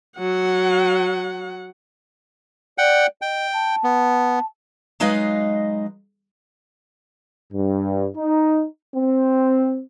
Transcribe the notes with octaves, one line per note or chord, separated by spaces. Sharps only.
F#3 F#5
D5 F#5 G5
D#5 G5
A5
B3
F#3 G#3 D#4 B4 D#5 F5
G2
D#4
C4